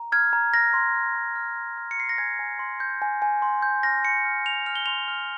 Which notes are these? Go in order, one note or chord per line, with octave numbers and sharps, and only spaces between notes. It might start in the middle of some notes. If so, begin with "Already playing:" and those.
Already playing: A#5
F6 G#6
A#5
F6 A#6
C6
F6
C6
F6
C6
F6
C#7
C6 C7
A#6
G#5 G#6
G#5
C6
G6
G#5
G#5
C6
G6
F6 A#6
C6 C#7
F6
C6 F7
F6 F7
G7
C6 F7
F6